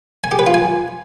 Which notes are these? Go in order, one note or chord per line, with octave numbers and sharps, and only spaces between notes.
G#5
G4
B4
F4
G#5